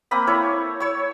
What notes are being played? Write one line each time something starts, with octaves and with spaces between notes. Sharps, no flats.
A#3 C4 B5 D#6
E4 A4 C5 C#5
C#5 C#6 E6